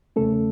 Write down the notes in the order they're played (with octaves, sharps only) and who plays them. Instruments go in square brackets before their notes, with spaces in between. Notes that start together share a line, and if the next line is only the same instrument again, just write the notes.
[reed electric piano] E2 C#3 A3 C#4 A4